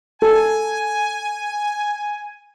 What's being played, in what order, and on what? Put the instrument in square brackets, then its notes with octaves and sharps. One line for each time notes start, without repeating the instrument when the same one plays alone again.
[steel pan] A4 [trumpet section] G#5